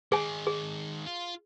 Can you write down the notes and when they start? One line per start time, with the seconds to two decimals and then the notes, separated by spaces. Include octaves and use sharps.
0.12 D#3 G#3 G#4 G#5
0.47 G#4
1.06 F4